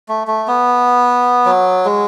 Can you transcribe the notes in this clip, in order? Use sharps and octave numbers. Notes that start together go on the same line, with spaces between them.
A3
A3
B3
F#3
G#3